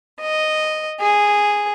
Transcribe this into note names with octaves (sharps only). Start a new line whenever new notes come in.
D#5
G#4